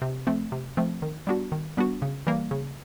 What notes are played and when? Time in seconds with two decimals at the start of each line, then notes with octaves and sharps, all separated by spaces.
0.02 C3
0.27 F3 A3 C4
0.52 C3
0.77 F3 A3 C4
1.02 D#3
1.27 G3 B3 D4 F#4
1.52 D#3
1.77 G3 B3 D4 F#4
2.02 C#3
2.27 E3 G3 A#3
2.51 C#3